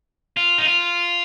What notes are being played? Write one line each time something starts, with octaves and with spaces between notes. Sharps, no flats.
F4
D#4
F4